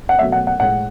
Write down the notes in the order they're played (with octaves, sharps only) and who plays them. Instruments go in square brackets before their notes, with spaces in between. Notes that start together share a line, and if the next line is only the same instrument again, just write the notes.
[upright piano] F#5
B2 F#3 A3 E5
F#5
F#5
A2 G#3 F#5